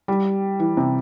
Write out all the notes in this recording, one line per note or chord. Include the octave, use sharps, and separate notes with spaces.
G3
E3
C3